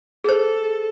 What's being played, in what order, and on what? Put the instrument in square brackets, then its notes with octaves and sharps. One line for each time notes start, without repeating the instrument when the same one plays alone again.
[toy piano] G#4 C5 [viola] A4